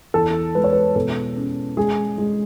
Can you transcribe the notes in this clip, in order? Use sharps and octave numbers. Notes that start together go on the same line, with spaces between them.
E2 A4
G#3 B4
C#5
B4
B2 A4
C#4
G#3 G#4
G#3